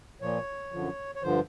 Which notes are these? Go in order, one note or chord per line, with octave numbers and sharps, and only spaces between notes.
A#2 F3 C#5
F#2 D3 F3
C#5
G2 D3 F3 C5